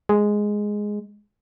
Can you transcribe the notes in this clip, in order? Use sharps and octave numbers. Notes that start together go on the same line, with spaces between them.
G#3